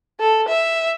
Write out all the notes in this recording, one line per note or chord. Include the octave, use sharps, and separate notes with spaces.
A4
E5